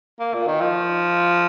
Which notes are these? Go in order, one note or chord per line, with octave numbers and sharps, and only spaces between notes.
A#3
A#2
D#3
F3